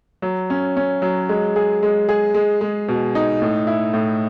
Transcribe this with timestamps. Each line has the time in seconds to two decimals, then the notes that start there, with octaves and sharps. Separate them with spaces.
0.22 F#3
0.50 C#4
0.77 C#4
1.02 F#3
1.29 G#3
1.56 G#4
1.83 G#3
2.09 G#4
2.34 G#3
2.61 G#3
2.88 B2
3.15 D#4
3.42 A2
3.67 E4
3.94 A2